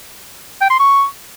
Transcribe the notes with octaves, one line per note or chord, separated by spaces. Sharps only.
G5
C6
C#6